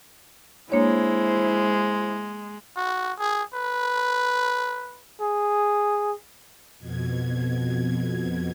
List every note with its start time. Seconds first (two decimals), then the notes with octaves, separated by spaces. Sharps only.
0.72 G#3 A#3 D4 E4 C5 C#5
2.76 F#4
3.19 G#4
3.54 B4
5.21 G#4
6.79 F2 B2 G#6